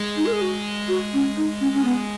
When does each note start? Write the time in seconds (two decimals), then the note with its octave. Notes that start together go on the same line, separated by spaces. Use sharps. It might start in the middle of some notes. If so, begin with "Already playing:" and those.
Already playing: G#3
0.17 D#4
0.26 A#4
0.33 G#4
0.42 F#4
0.88 F#4
1.14 C#4
1.37 D#4
1.61 C#4
1.74 C#4
1.84 B3